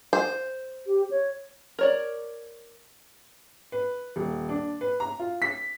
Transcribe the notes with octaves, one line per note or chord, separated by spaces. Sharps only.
C5
G4
C#5
A#4 C#5 D5
B4
D#1
D4
B4
A#5
F4
B6